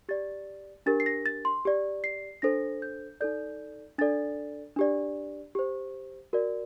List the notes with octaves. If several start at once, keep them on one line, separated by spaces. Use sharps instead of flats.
G4 D5 A6
D4 G4 A#4 A6
C7
A#6
A6
C6
G4 D5
C7
D4 A4 C5 A#6
G6
D#4 A4 D5 G6
D4 A4 D5 A6
D4 G4 D5
G4 C5
F#4 A#4 D5